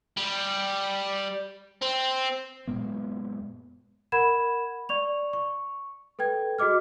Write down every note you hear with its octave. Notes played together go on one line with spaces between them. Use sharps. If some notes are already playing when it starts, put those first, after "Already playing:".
G3
C4
F#2 A#2 G#3 B3
A#4 F#5 B5 G#6 E7
D5 C#6 F7
C#6
A4 B4 G5 G#6
F#4 G#4 D#5 D6 F6